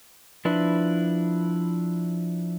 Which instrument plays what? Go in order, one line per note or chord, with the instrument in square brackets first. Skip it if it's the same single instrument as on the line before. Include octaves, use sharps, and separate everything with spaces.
[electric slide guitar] F3 D4 E4 B4